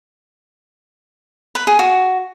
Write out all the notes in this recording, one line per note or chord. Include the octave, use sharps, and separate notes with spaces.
B4
G#4
F#4